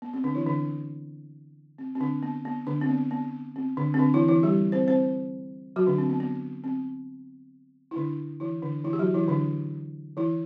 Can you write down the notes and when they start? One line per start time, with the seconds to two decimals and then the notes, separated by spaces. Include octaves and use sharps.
0.02 B3
0.14 C4
0.24 D3 D4
0.35 E3 E4
0.46 D3 D4
1.78 C4
1.95 C4
2.00 D3 D4
2.23 B3
2.45 B3
2.67 D3 D4
2.81 C4
2.89 B3
3.11 B3
3.56 C4
3.77 D3 D4
3.94 C4
3.99 D3 D4
4.14 E3 E4
4.28 E3 E4
4.43 G3 G4
4.72 C4 C5
4.87 C4 C5
5.76 F#3 F#4
5.87 D3 D4
5.98 C4
6.10 B3
6.20 B3
6.64 C4
7.91 E4
7.96 D3 D4
8.40 E3 E4
8.62 D3 D4
8.84 E3 E4
8.93 G4
8.99 F#3 F#4
9.14 E3 E4
9.28 D3 D4
10.17 E3 E4